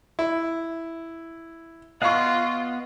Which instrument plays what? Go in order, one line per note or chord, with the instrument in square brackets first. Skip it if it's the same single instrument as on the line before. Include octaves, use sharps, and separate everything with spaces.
[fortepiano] E4
[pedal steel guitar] B3 D#5 F#5 [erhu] F4 [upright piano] F5 C#6